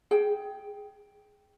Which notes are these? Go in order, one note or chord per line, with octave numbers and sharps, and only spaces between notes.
G#4 G5